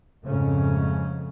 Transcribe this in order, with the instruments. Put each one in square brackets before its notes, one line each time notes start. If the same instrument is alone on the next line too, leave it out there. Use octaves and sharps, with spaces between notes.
[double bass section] F2 G#2 C#3 A3 C#4